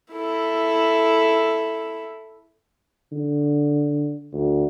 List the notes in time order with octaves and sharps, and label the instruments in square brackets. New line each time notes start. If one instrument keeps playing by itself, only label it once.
[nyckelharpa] E4 A4
[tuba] D3
D2